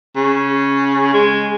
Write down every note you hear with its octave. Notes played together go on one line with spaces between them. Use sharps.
C#3
G#3